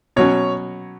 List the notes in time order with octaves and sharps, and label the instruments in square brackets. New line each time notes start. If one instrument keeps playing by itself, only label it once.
[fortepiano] B2 F#3 C#4 [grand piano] C#5